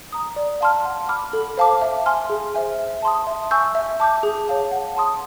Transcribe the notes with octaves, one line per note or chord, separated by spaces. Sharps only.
A#5 D#6
D5
F5 A5 C6 F6
F#5
B5 D6 F6
A4
C5 F5 A5 D6
E5
G#5 C6 F6
G#4
C5 E5 G#5
E5
A5 C6 D#6
E5
G#5 C#6 E6 G6
E5
A5 D6 G6
G#4
C#5 F5 A5
F#5
A5 C6 D#6